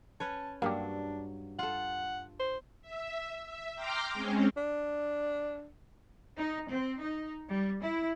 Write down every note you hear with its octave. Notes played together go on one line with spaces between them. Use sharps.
C#4 B4 C#5 A5
G2 F#3 A#3 D4 G4
F4 A4 F#5
C5
E5
E5
G5 A#5 C6 D6 F6 G6
G#3 C4 C#4
D4
D#4
C4
D#4
G3
E4